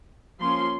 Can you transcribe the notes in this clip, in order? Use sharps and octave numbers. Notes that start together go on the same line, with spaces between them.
F3 A#3 C#4 C6